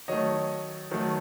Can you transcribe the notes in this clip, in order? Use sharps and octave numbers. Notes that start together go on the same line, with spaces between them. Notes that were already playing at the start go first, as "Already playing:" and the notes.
D#3 F#3 A3 C#5 D#5
D#3 F#3 A3